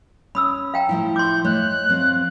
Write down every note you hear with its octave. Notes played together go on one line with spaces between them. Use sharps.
C#4 B5 D#6 E6
F5 G5 A#5
A2 F3 E4
C6 D6 G6
A3 C#5 D#5 F#6
F3 C4 F#4